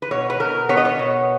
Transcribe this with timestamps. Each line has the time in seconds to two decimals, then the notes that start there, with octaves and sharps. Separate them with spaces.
0.02 B4
0.11 B2 C#5
0.30 B4
0.40 B2 A#4
0.69 B3 C#5
0.77 D#5
0.85 C#5
0.99 B2